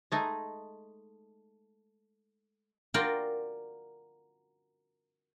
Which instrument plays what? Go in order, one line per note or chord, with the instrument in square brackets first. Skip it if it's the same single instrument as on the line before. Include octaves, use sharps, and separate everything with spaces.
[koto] G#3 A3 D#4
[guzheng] F4 F#4 A#4 D5 G5